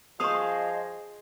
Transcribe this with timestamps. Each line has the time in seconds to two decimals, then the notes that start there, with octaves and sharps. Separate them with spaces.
0.20 F3 G#4 C5 D#5 F5 C#6 D#6